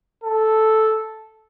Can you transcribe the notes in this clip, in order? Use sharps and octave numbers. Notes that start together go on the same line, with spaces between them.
A4